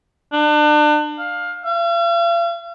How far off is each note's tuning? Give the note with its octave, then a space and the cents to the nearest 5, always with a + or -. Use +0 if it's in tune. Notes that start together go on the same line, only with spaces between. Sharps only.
D4 +30
F5 +15
F5 -45